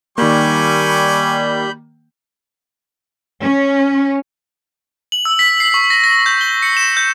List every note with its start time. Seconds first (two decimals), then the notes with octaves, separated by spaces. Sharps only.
0.18 D#3 G3 A#3 G#5 B5 C#6 D6 G6
3.41 C#4
5.12 F#7
5.25 E6
5.39 B6
5.60 C7
5.74 C#6
5.90 A#6
6.04 A#6
6.26 G6
6.41 G7
6.63 C#7
6.77 E7
6.97 G6